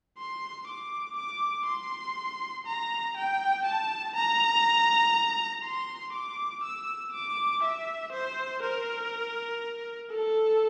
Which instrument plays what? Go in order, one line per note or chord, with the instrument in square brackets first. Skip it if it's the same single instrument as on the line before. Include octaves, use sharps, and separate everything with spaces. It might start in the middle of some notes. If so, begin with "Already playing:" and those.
[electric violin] C6
D6
D6
C6
A#5
G5
A5
A#5
C6
D6
E6
D6
E5
C5
A#4
A4